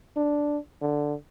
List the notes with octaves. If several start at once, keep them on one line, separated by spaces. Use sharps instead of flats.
D4
D3